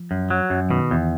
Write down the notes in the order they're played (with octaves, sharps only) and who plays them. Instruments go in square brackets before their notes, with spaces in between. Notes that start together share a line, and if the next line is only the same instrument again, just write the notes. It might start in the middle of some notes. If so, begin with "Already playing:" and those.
Already playing: [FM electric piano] F3
[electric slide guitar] F#2
F#3
F#2
[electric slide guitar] B2 [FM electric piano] D#3
[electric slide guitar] E2